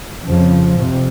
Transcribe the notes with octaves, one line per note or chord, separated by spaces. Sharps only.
F2 C#3 F3
F2 C3